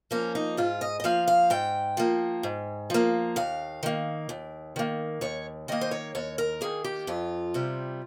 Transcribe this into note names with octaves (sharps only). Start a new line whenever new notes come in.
F3 A#3 C#4
D#4
G#2 F4
D#5
D#5
F3 A#3 F5
F5
G#2 G5
F3 A#3
G#2
F3 A#3
D#2 F5
D#3 A#3
D#2
D#3 A#3
D#2 C#5
D#3 A#3 D#5
C5
C#5
D#2 C#5
A#4
D#3 A#3 G#4
G4
F2 F4
C3 G3